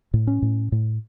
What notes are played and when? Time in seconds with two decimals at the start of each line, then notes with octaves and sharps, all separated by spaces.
0.14 A2
0.27 C#4
0.42 A2
0.72 A2